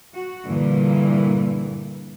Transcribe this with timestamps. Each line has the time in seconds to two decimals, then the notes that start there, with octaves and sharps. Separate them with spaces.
0.14 F#4
0.46 G2 A#2 D3 E3 A#3